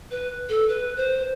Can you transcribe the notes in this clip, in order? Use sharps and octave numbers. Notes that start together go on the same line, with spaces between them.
B4
A4
B4
C5